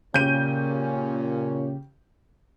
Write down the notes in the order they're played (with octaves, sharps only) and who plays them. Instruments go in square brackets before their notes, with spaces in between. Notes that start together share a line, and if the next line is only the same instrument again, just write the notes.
[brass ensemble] A#2 C#4 [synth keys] C#3 G4 [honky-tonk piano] G6 D#7